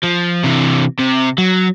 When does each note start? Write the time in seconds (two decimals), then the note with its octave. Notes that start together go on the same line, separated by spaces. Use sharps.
0.04 F3
0.44 C3 E3
0.99 C3
1.38 F#3